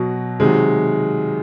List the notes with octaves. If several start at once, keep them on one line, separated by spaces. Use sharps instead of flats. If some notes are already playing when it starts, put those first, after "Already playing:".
Already playing: B2 F#3
C3 D#3 F#3 G#3